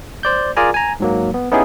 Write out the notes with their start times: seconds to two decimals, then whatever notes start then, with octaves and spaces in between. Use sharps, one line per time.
0.23 C5 D5 G6
0.57 F4 G#4 A#4 D5 G#5 A#5
0.74 G#5 A#5
1.00 G#2 F#3 A#3
1.34 B3
1.52 B3 C#4 D#4 E4 G4 G#4